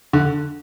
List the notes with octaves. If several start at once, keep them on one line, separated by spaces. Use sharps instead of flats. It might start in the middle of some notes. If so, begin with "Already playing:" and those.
D3